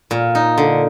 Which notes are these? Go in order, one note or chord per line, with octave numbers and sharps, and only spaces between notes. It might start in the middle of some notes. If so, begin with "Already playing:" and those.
A#2
D#4
D3